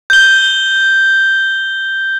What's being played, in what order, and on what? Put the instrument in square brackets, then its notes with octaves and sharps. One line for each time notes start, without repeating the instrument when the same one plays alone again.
[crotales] G6 G7